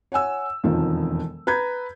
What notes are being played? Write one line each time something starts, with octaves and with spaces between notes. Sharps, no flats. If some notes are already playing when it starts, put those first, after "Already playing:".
C#5 F#5 G#5 E6
E1 F2 D#3 F3
B4 A#5 G6 G#6